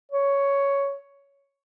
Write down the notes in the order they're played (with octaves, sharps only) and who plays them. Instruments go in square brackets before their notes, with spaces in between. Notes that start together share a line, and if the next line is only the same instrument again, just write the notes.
[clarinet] C#5